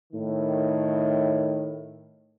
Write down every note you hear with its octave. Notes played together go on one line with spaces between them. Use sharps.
A2 D#3